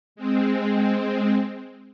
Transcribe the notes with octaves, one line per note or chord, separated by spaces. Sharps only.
G#3 C4